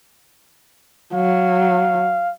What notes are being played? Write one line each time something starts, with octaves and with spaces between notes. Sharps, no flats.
F#3 F5